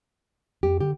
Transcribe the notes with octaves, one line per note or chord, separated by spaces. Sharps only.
F2 G4
D3 G4